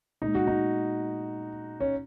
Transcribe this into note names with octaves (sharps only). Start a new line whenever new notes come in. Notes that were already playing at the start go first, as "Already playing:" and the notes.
A#2 G#3 D#4
F#4
D#4
C#4